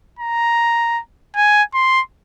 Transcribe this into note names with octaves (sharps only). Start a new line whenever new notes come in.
A#5
G#5
C6